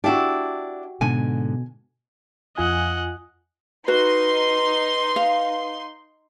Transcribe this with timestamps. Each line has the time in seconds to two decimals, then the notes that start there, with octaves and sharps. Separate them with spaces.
0.04 D4 E4 F#4 G4
1.01 G#2 B2 D3 G#5
2.58 F2 F4 D#5 F#5 G#5
3.88 D#4 F#4 B4 C6
5.16 F5